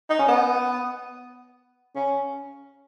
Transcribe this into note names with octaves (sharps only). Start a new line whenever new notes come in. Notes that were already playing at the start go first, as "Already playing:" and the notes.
D#4
C#4
B3
C#4